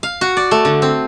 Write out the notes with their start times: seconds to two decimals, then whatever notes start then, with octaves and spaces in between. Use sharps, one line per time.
0.03 F5
0.21 F#4
0.37 D5
0.51 A3
0.65 D3
0.82 C4